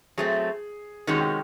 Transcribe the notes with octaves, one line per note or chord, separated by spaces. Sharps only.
F#3 A3 C4 G#4
C3 D#3 G#3 C#4 F#4 G#4
G4